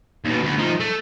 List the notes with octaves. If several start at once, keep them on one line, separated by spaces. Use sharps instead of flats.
D#2 B2
D2 B3
F3 D#4
A3